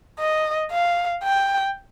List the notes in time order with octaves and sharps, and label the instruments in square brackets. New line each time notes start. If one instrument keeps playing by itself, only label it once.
[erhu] D#5
F5
G5